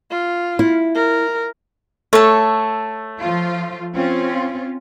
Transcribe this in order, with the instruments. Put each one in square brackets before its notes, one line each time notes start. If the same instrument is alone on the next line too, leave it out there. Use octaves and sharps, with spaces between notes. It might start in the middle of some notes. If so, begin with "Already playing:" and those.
[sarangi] F4
[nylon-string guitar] E4
[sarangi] A#4
[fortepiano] A3 [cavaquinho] A4 C#5
[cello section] F3 F4
C4 C#4 F4